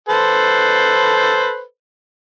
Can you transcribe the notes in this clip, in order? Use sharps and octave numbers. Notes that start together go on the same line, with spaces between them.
A4 B4 C5